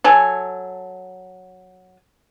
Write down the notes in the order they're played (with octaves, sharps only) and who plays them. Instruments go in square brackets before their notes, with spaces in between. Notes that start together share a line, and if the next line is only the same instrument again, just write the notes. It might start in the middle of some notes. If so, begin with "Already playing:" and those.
[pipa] F#3 A4 G#5